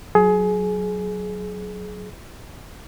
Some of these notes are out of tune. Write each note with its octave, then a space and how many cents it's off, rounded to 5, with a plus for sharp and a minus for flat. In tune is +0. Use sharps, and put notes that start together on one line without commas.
F#3 +0 G#4 +25